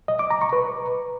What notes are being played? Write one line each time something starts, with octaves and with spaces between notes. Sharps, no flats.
D#5
D6
A#5
C#6
B4